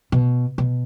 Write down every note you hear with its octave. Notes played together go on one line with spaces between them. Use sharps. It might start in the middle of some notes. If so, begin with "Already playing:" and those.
B2
B2